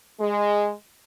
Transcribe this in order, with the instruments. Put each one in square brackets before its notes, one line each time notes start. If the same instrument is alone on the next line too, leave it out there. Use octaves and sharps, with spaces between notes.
[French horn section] G#3